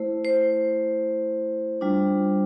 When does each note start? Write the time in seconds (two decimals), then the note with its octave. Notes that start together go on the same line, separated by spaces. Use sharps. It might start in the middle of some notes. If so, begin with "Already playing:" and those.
Already playing: A3 E4 C5
0.24 C5
1.81 G3 D4 F4